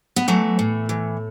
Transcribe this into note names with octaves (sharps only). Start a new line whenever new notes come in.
B3
E3 F#3 A3
A2
E3